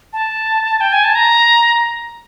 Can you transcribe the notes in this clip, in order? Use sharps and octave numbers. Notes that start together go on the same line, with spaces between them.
A5
G5
G#5
A5
A#5